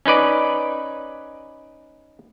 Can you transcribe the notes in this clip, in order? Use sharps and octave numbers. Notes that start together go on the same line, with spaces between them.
C#4 D#4 B4 D5